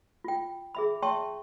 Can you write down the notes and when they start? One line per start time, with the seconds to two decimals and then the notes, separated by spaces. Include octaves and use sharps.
0.25 F4 G5
0.75 G#4 E5 B5
1.02 C#5 E5 G5 A5 C6 C#6